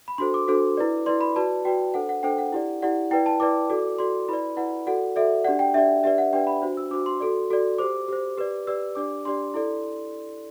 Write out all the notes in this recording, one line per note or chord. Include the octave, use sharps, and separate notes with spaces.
B5
D4 F#4 A4 C5 C6
D6
D4 F#4 A4 C5
E4 B4 D5
E4 B4 D5 C6
B5
F#4 B4 D5 A5
F#4 B4 D5 G5
D4 A4 C5 F#5
F#5
D4 A4 C5 G5
F#5
E4 G4 D5
E4 G4 D5 F#5
E4 B4 D5 G5
A5
E4 B4 D5 D6
F#4 A4 D5
F#4 A4 D5 C6
E4 B4 D5 B5
E4 B4 D5 F#5
F#4 A4 D5 F#5
F#4 A4 D5 E5
D4 G4 D5 F#5
G5
D4 G4 D5 E5
D4 G4 B4 D5 E5
F#5
D4 G4 B4 D5 G5
B5
D4 F#4 C5
E6
D4 F#4 C5 D6
C6
F#4 A4 D5
F#4 A4 D5
G4 C5 D6
G4 C5
G4 B4 D5
G4 B4 D5 E6
D4 G4 D5 D6
D4 G4 D5 C6
E4 A4 D5